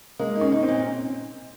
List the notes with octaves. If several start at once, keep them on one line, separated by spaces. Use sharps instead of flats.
G#3 A#3
D#4
C#4
D#4
C4
A#2